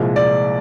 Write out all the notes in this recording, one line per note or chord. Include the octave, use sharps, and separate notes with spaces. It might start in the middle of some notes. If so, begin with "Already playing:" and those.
Already playing: C2 A#2 F3 G#3
D5